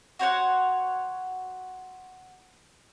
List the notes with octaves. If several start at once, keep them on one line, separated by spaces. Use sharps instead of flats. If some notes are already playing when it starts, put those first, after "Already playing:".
F#4 C5 C#5 F#5